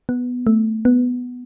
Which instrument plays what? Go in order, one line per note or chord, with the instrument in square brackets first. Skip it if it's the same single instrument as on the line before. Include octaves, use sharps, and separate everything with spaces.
[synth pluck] B3
A3
B3